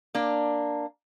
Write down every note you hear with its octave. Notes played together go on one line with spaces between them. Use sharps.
A#3 D4